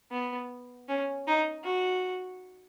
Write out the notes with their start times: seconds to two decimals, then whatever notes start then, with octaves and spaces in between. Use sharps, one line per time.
0.12 B3
0.88 C#4
1.27 D#4
1.64 F#4